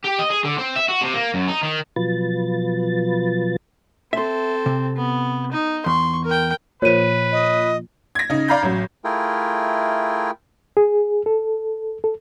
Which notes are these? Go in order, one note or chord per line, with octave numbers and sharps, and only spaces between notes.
G4
D#5
G#4
D3
C4
E5
F#4
C3
A#3
F#2
D#4
D#3
B2 F3 F#3 F4 B4 A6
C4 A4 E5 C6
C3
B3
D#4
E2 C6 C#6
A#4 G5
A#2 F3 B4 C#5 D#7
D#5
G#6 A#6
C#3 D#4
D5 F5 A#5 B5 G6
A1 F#3
A3 E4 F4 G#4 A#4 G5
G#4
A4
A4